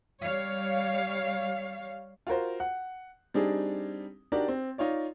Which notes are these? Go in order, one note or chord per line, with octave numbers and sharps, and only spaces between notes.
G3 C#5 F5
F4 F#4 A#4 C5
F#5
G3 C4 D4 D#4 G#4
D4 D#4 F#4 G4 A#4 D5
C4
D#4 F4 C#5 D5